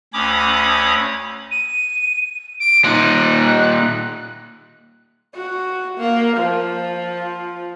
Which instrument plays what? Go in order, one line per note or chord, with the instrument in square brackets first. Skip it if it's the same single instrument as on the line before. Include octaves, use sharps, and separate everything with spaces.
[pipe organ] D2 C#4 C#5 B5 D6 D#6
[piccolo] D#7
D7
[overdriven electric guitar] A#2 D#4 [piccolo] F#6
[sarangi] F#4
A#3
F3